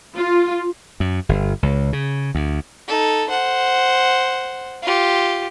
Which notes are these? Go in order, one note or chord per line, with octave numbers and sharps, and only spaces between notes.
F4
F#2
G1
C#2
C#3
D2
D#4 A4
C5 F#5
F4 G4